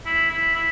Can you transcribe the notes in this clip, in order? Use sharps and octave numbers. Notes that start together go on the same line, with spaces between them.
E4
E4
E4